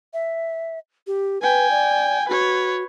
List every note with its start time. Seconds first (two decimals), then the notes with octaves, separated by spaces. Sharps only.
0.14 E5
1.07 G4
1.41 B4 G5 G#5
1.71 D5
2.28 F#4 B4 C#5